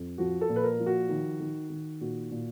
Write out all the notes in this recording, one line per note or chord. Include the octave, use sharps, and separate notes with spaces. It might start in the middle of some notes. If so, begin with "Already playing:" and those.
Already playing: F2
F3 F#4
A4
A#2
B4
A#4
F3
F#4
D#3
D#3
D#3
A#2 F#4
A#2